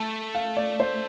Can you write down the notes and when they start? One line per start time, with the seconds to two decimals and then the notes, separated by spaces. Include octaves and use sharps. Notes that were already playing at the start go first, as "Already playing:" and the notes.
Already playing: A3 A5
0.35 F5
0.57 D5
0.80 C5